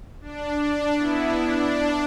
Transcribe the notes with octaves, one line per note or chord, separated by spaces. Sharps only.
D4
D4
B3 E4
D4